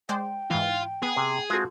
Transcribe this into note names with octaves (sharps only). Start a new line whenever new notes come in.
G#3 C5 D5 G5
G#2 E3 F4
B3 G#4
C3
G#3 C4 F4 F#4 A4